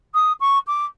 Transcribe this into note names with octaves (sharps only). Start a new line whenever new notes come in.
D#6
C#6
D6